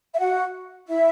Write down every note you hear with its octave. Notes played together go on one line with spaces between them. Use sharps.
E5
F#4 F#5
E4 E5